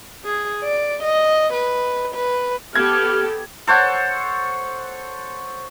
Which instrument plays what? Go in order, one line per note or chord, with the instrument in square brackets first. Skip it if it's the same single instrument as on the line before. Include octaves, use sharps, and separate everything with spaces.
[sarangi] G#4
D5
D#5
B4
B4
[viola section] B3 G4 A4 [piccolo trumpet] F6 [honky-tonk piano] G#6
[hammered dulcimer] A4 C5 C#5 F#5